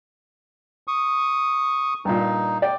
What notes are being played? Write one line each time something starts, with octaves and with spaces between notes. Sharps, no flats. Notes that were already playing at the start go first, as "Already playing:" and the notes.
C#6 D#6
G2 A#2 D#4
D5 G5